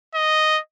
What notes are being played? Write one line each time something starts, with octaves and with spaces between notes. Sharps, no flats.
D#5